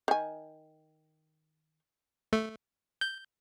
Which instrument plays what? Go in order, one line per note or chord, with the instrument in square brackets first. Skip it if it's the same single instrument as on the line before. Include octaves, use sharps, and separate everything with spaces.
[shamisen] D#3 G#5
[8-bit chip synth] A3
G6